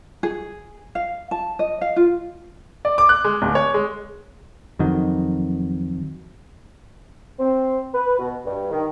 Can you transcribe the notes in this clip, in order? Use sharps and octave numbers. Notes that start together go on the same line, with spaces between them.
G#4
F5
A5
D#5
F5
F4
D5
D6
F#6
G#3
D1
C#5
G#3
F2 D#3 F#3
C4
B4
B2
G2
D#3